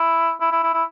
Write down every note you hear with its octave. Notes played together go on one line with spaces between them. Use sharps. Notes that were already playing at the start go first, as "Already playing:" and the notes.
Already playing: E4
E4
E4
E4
E4